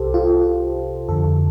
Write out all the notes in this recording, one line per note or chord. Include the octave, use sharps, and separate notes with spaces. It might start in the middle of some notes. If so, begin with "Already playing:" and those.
Already playing: C2 C3 G4 A4 C5
F4
F2 D3 A4